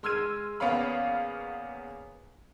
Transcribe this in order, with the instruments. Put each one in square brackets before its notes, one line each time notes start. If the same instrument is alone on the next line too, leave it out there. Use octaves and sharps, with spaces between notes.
[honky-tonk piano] G#3 C6 E6 F6 G#6 D#7
E2 A#3 B3 C#4 F5 B5